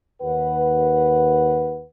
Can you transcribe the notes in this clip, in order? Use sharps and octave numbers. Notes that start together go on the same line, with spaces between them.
D#2 B4 F#5